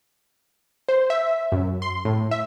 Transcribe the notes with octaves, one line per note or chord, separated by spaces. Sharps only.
C5
E5
F#2
C6
A2
E5